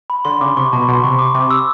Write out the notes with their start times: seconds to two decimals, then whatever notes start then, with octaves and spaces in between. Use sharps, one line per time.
0.10 B5
0.25 D3 C6
0.41 C#3 D6
0.57 C3 C#6
0.72 B2 A5
0.82 B5
0.88 B2 C6
1.03 C3 C#6
1.19 D6
1.34 C3 D6
1.51 E6